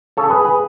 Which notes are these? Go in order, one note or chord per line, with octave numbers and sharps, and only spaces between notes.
C#3 A4 C#5
G#4 B4
F#3
G#4 B4